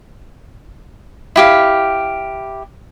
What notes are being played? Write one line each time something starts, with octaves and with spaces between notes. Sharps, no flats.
E4 G4 F5